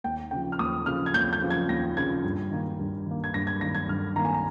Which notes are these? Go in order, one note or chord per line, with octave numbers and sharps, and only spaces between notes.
D#2 G5
C#3 F3 G5
F6
D#2 D#6
C#3 F3 F6
G#6
D#2 G6
G6
C#3 F3
G#6
D#2 A#6
C#3 F3 G#6
G2
D#3 A#3
G2
D#3 A#3
G#6
G2 A#6
G#6
D#3 A#3 A#6
G#6
G2 F6
D#3 A#3 A#5
G#5
A#5